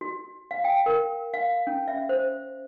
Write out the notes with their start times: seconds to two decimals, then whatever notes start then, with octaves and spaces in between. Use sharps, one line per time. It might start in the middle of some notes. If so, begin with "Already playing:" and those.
0.01 F#4
0.51 F5
0.64 G5
0.86 A#4
1.34 F5
1.67 C#4
1.88 E5
2.09 C5